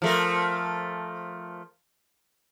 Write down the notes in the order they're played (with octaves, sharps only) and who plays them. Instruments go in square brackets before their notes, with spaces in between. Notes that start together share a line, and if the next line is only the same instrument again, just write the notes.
[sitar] F3 A3 A#4